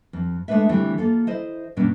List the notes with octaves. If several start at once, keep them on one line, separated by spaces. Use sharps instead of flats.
F2
G#3 A3 B3 D4 B4 E5
D3 E3 G3 A3 C4
A#3 F4 A4
E4 C5 D#5
G2 B2 A#3 C#4 D4